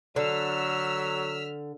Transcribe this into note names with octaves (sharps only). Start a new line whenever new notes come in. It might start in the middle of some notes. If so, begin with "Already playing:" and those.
D3 F#3 E6 F6 B6